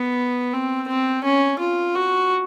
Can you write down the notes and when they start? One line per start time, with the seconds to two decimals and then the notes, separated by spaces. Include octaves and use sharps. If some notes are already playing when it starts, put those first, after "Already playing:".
Already playing: B3
0.53 C4
0.88 C4
1.24 C#4
1.59 F4
1.95 F#4